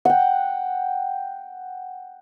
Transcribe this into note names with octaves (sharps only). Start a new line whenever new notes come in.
F#5 G5